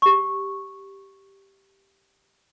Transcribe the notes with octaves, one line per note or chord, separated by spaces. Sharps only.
G4 C#6